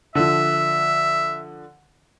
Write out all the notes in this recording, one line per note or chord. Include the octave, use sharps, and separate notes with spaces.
D3 F3 E5